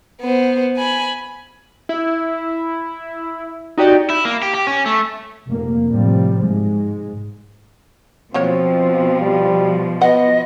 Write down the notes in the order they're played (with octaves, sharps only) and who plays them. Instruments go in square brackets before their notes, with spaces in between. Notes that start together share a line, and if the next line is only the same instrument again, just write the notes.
[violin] B3 C5
G#5 B5
[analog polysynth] E4
D#4 F#4 G4 D5 D#5
[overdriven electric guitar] E4
A#3
G4
G4
C#4
A3
[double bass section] F1 A#3
A2 C3 F3 G3
G#2 G#3
[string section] B2 F3 [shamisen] F#3 A#3 C#5 [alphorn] C4
[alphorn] G3
[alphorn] B3 [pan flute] D#5 [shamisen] F#5